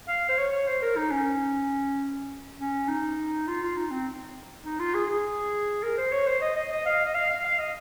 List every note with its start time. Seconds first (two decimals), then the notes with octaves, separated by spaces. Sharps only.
0.09 F5
0.29 C5
0.38 C#5
0.52 C#5
0.68 C5
0.82 A#4
0.96 D#4
1.11 C#4
2.58 C#4
2.88 D#4
3.48 F4
3.62 F4
3.76 D#4
3.91 C4
4.65 D#4
4.79 F4
4.94 G#4
5.09 G#4
5.83 A#4
5.98 C5
6.12 C#5
6.27 C5
6.41 D#5
6.56 D#5
6.71 D#5
6.86 F5
7.05 D#5
7.15 F5
7.30 F5
7.45 F5
7.59 D#5